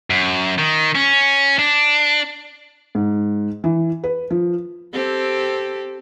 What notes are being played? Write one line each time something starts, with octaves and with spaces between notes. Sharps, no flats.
F#2
D#3
C#4
D4
G#2
E3
B4
F3
C4 G4 A4